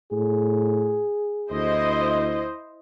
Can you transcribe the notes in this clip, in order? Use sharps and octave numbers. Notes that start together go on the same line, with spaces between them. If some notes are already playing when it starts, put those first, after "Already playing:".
A2 G#4
D2 E4 C5 D#5